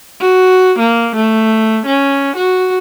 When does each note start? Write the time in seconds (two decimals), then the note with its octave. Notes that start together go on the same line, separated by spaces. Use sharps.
0.21 F#4
0.79 A#3
1.16 A3
1.86 C#4
2.36 F#4